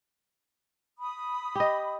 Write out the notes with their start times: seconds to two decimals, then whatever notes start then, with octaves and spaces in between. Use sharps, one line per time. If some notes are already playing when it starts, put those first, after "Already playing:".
0.98 B5 D#6
1.55 G4 D#5